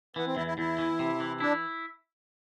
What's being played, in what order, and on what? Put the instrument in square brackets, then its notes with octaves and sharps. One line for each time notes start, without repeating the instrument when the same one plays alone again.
[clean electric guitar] E3 [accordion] B3
[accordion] C4
[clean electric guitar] E2 [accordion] E4
[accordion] E4
[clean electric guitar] E2 [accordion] E4
[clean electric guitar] E3
C3
E3
[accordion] D4 [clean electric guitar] E4